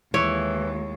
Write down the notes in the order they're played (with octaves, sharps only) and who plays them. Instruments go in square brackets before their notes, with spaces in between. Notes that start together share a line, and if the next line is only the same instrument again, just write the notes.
[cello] D#2 G#3 [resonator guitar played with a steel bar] E3 [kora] C#5